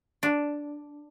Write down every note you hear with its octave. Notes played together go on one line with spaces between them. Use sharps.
D4